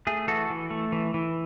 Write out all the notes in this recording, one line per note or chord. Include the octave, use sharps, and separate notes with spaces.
A3 G#4
E3 F#4 A4
E3
A3
E3
E3